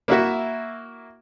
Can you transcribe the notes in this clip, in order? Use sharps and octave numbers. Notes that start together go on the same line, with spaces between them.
A#3 E4 F#4 E5